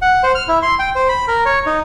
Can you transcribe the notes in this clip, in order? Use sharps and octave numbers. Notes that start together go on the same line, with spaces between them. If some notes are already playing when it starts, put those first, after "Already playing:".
F#5
C5
F6
E4
C6
G5
C5
B5
A#4
C#5
D#4